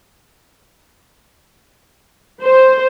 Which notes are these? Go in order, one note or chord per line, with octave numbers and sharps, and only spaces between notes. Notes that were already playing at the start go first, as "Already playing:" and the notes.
C5